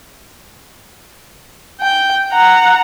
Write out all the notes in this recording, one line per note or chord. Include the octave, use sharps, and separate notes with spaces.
G5
F#5 A#5